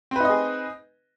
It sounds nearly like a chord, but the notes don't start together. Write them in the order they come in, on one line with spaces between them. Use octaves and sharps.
C4 B4 D#4 D#5 G#4